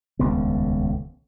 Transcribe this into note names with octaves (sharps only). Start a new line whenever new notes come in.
D#1 C#2 D3 B3